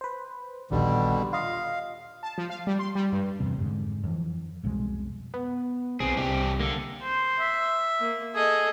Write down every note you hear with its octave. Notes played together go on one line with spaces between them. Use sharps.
B4 C5
A#1 D#2 B2 D3 G3
F4 D#5 F5
A5
F3
F5
G3
C6
G3
G2
E2 G2 C3
F2 G#2 D3
F2 E3
C2 F2 B2 G#3
B3
B1 B3 C4 G#4
C2 C3 D4 G4
D3 A#3
C5
E5
A#3
G#4 A4 D#5